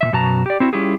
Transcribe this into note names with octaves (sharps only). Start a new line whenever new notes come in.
A#2 D#3 E5
F#2 B2 F#4 A5 A#5
G4 D5
C4 E4 F#4
G3 C#4 E4 F4 G4 G#4